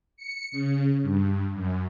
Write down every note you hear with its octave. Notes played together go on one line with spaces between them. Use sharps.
C#7
C#3
G2
F#2